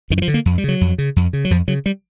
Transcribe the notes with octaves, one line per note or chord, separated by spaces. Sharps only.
F#2 D#3
E3
F3
D3
A#3
F2
G3
C#3 F#3
F2
C#3
F2
C#3
F#3
F2 F3
C#3 F#3
G3